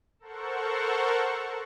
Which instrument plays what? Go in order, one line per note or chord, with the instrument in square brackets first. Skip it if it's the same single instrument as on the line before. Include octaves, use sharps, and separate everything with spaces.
[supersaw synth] A4 A#4 C5 F#5 C#6